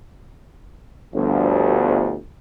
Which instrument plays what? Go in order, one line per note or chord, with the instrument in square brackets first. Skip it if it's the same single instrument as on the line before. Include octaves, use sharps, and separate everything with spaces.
[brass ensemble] G1 D2 F3